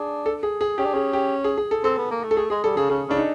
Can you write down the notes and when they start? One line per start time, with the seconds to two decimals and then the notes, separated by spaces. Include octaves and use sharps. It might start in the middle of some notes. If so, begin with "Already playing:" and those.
Already playing: D4 G#4
0.26 A4
0.43 G#4
0.61 G#4
0.78 C#4 G4
0.86 D4
0.94 C#4 G#4
1.13 G4
1.44 G#4
1.58 G#4
1.71 A4
1.84 C4 A4
1.98 B3
2.11 A#3
2.23 A3
2.31 A4
2.37 A3 G#4
2.50 G#3 G#4
2.64 G3 A4
2.76 C#3 G#4
2.90 C#3 G#4
3.08 C#3 D4
3.17 D#4